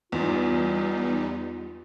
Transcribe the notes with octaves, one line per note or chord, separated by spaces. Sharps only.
E2 G3 B3 D#4 F4